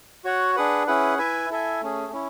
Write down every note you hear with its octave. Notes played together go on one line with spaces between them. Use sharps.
F#4 C#5 F#5
D4 G#4 B4 F#5
C#4 E4 G#4 B4 F#5
E4 B4 E5 G#5
E4 A4 E5 G#5
A3 C#4 G#4
C#4 E4